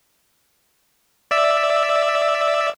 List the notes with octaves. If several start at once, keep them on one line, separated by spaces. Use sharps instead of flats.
D5 E5 E6